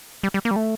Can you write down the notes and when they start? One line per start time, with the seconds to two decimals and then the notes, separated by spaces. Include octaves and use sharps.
0.23 G3
0.34 G3
0.45 A#3
0.51 G3
0.56 A3